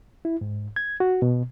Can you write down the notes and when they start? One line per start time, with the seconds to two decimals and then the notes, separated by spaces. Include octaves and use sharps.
0.25 E4
0.41 G#2
0.76 G#6
1.00 F#4
1.22 B2